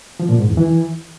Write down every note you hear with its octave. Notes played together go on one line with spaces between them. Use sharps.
F3
A#2
G#2
E2
E3